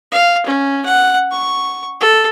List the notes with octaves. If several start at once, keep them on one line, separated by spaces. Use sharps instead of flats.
F5
C#4
F#5
C#6
A4